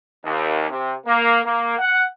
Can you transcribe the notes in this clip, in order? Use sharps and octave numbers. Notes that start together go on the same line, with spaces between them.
D#2
C3
A#3
A#3
F#5